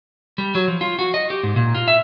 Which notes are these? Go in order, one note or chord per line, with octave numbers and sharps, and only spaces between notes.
G3
F#3
F3
F4
F#4
D#5
G4
G#2
A#2
F4
E5